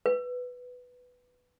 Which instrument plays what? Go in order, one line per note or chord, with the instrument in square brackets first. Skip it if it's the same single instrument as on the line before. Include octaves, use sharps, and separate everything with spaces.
[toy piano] B4